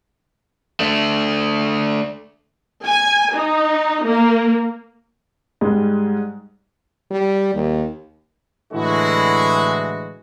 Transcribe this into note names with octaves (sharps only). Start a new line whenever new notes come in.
A3 D4
G#5
D#4
A#3
G#2 G3 G#3
G3
D#2
A2 D3 E3 G#3 E4 F#4